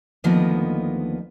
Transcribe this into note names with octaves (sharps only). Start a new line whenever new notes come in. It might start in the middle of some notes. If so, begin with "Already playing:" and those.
D2 D#3 F3 A#3 B3 D#5